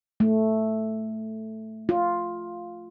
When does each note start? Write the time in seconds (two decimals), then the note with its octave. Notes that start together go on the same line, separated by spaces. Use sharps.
0.20 A3
1.89 F4